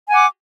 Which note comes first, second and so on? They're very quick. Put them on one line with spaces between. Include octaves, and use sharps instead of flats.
G#5 F#5 D6